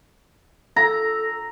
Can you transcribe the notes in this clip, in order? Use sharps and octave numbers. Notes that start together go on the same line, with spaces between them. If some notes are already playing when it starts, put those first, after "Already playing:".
A4 A#5